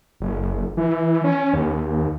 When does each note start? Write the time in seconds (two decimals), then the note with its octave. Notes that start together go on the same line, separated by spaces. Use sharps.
0.20 F#1
0.77 E3
1.24 C#4
1.54 D#2